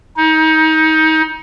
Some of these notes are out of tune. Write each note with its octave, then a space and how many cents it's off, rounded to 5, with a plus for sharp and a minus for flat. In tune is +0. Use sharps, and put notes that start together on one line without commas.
D#4 +25